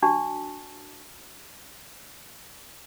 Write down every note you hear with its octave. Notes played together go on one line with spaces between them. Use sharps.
D4 F#4 A5 C#6